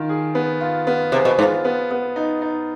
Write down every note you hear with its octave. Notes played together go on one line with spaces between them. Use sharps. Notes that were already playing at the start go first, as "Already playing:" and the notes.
Already playing: D#3 F4
G#4
B3
F4
B3
C3 G#4
B2
G#2 F4
B3
B3
D#4
D#4